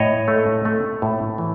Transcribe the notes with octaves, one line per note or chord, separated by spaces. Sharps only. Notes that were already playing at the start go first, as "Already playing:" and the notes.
Already playing: A2 C#5 D#5
A3
A3
A2
E3